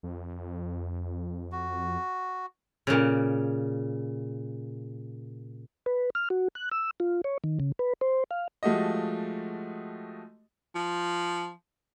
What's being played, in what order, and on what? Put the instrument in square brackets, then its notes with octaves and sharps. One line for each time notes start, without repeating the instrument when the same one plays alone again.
[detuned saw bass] F2
[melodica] F#4
[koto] A#2 C#3
[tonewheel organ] B4
F6
F#4
F#6
E6
F4
C#5
D#3
C#3
B4
C5
F5
[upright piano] F3 G#3 A3 F#4 G4 D#5
[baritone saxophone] F3